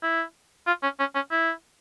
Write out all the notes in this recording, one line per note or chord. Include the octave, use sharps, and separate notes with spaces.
E4
F4
C#4
C#4
C#4
E4